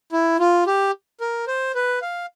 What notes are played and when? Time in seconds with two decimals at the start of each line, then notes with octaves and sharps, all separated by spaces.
0.12 E4
0.40 F4
0.67 G4
1.21 A#4
1.48 C5
1.75 B4
2.02 F5